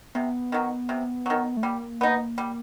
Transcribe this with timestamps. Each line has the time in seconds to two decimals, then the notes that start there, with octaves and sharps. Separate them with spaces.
0.15 C3 B3
0.52 D#3 F#3
0.89 C3
1.26 D#3 F#3
1.57 A3
1.63 G3 A#3
2.01 B3 D#4
2.38 G3